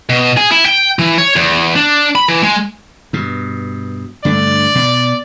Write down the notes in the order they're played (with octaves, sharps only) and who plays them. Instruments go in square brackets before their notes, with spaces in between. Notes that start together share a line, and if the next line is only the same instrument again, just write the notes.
[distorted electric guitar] B2
G#4
E4
G5
E3
C#5
E2
D4
B5
E3
G#3
[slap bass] G2 B2
[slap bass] G2 D3 A3 [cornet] D5
[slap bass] B2